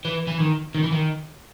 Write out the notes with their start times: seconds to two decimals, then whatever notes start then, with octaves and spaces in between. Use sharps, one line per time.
0.05 E3
0.27 E3
0.40 D#3
0.75 D#3
0.84 E3
0.92 D#3